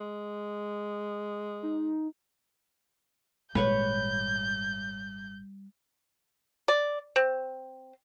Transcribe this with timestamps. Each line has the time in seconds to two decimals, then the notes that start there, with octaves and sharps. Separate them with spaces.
0.01 G#3
1.63 D#4
3.55 G#1 A#2 G3 G#3 B4 C#5 F#5 G6
6.68 D5
7.16 C4